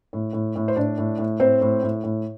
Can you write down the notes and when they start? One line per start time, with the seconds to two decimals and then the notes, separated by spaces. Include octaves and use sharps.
0.13 A2
0.33 A2
0.56 A2
0.68 C5
0.76 A2 D4 D5
0.98 A2
1.18 A2
1.40 A2 C4 C5
1.61 A2
1.83 A2
2.04 A2